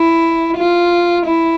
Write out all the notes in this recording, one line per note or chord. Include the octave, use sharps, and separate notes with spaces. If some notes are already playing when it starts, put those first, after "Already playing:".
Already playing: E4
F4
E4